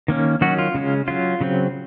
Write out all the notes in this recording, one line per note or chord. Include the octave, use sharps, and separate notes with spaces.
D#3 A#3 C#4
D#3 F#3 C#4 F#4
F4
C#3 G#3 C#4
F#3 C#4 F4
C#3 F#3 C4